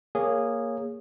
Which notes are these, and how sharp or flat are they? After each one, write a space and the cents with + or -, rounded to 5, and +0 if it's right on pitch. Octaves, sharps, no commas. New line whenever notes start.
A#3 -5 G#4 -15 C#5 +0